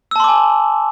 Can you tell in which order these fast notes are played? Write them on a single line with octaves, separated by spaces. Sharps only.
E6 A5 C6 D6 G#5